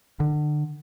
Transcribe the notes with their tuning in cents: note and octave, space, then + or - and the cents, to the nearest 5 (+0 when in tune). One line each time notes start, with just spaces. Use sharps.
D3 +30